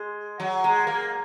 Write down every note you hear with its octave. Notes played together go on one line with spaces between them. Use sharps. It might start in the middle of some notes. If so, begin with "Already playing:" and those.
Already playing: G#3
F#3
G#3
A#3